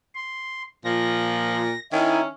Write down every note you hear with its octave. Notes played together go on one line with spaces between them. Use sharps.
C6
A#2 F3 A#6
D#3 C#4 D#4 E4 G#5